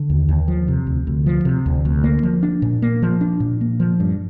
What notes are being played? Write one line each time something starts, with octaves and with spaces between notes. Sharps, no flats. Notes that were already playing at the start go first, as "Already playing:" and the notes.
Already playing: D3
D#2
D#2
F3
C3
D2
D2
F3
C3
D2
D2
A#3
F3
D4
A#2
A#3
F3
D4
A#2
A#3
F3
G2